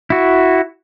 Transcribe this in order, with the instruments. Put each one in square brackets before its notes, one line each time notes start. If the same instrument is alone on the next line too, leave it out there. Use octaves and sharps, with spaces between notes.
[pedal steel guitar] E4 F#4